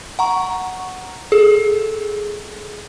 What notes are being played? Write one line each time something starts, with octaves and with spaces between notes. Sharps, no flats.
F#5 A#5 C#6
G#4 A4